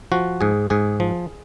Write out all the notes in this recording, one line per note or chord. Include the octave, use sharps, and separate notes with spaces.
F3 F#4
G#2 G#4
G#2 G#4
F3